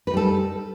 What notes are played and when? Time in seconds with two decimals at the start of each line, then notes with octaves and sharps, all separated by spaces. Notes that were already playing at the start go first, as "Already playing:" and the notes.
0.07 B4
0.10 D#4
0.14 G3
0.17 A4